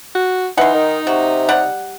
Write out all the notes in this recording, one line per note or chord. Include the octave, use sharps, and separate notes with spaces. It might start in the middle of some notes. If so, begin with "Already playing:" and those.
F#4
E3 D#4 F#5 C6
D#3
C3 F#4
G3 F#5